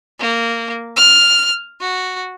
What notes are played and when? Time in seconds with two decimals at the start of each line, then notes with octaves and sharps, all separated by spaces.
0.20 A#3
0.96 F6
1.81 F#4